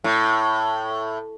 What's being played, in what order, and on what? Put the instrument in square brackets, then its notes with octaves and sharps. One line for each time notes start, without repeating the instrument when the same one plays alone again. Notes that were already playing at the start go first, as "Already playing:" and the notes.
[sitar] A2